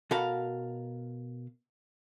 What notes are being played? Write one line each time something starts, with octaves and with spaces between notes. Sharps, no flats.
B2 F#4 A4 A#4 F5 B5